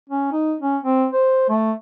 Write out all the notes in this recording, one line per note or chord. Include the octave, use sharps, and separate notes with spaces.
C#4
D#4
C#4
C4
C5
A3